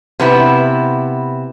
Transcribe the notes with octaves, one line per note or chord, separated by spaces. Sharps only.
C3 B3 E4